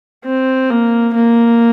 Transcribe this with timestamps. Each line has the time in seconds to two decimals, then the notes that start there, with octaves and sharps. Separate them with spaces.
0.25 C4
0.70 A#3
1.14 A#3